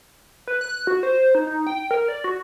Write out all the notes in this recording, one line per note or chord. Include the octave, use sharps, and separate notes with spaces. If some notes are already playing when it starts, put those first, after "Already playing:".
B4
F#6
F#4
C5
D#4
D#4
G5
A#4
D5
F#4